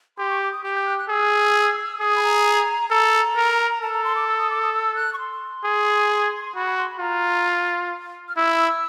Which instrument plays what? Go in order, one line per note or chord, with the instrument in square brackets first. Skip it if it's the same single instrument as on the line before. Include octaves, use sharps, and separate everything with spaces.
[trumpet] G4 [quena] C6
[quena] C#6
D6
D#6
[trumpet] G4 [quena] G6
[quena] G6
F#6
F#6
[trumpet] G#4 [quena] E6
[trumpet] G#4 [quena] D#6
[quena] B5
A#5
[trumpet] A4 [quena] A#5
[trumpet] A#4
[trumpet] A4 [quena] A5
[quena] A#5
C6
D6
E6
D#6
D6
D#6
E6
F#6
C#6
C6
[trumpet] G#4
[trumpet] F#4 [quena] B5
[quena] B5
C6
B5
[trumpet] F4 [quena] A#5
[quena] F6
[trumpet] E4 [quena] E6